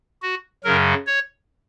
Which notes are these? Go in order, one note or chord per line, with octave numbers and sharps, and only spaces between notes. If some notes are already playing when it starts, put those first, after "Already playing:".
F#4
F#2 C#3 F#3 A#4
C#5